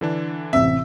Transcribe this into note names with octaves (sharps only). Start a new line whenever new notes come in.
D3 E3 D4
A1 C3 E5